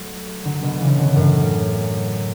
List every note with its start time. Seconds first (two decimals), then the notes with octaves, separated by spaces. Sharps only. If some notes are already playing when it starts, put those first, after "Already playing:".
Already playing: F#3 A3
0.45 D3 F#3
0.62 B2 D3
0.80 C#3 E3
0.98 B2 D3
1.16 F#2 A2